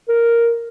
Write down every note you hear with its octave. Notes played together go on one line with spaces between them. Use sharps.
A#4